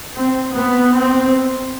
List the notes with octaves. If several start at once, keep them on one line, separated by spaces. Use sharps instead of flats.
C4
B3
C4